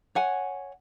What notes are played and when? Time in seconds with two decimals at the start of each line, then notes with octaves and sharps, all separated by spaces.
0.15 C#5 F#5 G#5